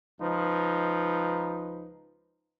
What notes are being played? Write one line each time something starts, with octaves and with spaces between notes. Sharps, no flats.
C#2 F3 D#4 B4